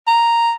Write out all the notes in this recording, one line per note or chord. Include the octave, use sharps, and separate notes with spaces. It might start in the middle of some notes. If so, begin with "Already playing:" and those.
A#5